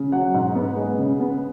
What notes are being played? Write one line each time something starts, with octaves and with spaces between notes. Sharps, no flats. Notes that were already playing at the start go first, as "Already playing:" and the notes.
Already playing: C#3
F#3 F#5
G#2
B3
G#3
C#3
B3